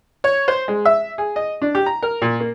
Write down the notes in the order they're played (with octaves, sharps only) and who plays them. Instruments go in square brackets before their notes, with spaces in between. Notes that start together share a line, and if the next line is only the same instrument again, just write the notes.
[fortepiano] C#5
C5
G#3
E5
G#4
D#5
D4
G4
A#5
A#4
A#2
A#3